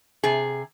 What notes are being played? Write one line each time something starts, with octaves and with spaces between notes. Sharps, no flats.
C3 G#4